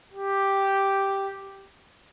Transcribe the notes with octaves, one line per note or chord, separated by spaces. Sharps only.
G4